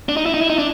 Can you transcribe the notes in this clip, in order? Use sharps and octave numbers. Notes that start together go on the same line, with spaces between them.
D4
D#4
E4
D#4
E4
D#4
D4